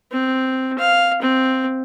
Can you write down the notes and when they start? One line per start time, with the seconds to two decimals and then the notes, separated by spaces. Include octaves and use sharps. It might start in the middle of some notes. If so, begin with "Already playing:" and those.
0.11 C4
0.79 F5
1.22 C4